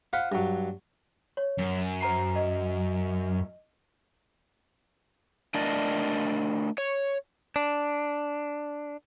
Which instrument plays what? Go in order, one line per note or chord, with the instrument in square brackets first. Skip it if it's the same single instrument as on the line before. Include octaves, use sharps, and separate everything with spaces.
[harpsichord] F4 C5 F#5 B5
G2 F#3
[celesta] C#5
[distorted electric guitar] F#2
[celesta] C5 A#5 C7
D#5
[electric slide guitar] A3 D4 A#4 D5 D#5
C#5
[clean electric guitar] D4